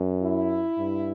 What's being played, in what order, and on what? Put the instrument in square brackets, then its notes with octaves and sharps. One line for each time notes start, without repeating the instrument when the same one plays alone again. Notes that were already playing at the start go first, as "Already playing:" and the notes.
Already playing: [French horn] F#2
[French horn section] E4
[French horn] G2